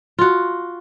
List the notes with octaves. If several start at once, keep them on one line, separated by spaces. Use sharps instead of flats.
F4 F#4